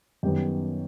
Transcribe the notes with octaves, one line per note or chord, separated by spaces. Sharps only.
F#2 D#3 G3 B3 G4